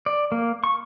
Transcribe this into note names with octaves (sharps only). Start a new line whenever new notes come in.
D5
A#3
C#6